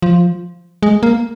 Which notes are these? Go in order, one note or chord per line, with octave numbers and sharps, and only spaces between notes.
F3
G#3
A#3